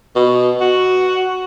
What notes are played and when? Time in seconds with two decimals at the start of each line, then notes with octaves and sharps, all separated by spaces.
0.16 B2
0.61 F#4